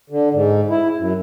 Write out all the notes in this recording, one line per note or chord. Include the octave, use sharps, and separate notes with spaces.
D3
G#2
E4
F#2